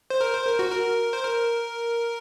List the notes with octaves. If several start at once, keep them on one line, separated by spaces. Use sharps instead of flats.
C5
A#4
C5
A#4
F#4
A#4
C5
A#4